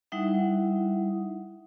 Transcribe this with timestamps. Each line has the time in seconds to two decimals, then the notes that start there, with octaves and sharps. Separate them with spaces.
0.12 G3 D#4 E4 E5 F#5